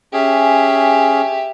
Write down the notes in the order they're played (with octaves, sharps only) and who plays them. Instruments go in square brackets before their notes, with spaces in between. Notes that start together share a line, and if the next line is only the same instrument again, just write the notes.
[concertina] C#4 G#4 [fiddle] G4 E5